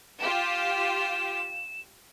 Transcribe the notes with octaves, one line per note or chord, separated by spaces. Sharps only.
F4 G4 E7